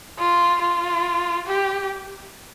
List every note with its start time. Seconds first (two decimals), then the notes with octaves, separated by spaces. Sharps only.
0.19 F4
0.61 F4
1.47 G4